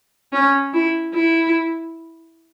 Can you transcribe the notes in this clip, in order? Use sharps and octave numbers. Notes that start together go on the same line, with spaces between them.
C#4
E4
E4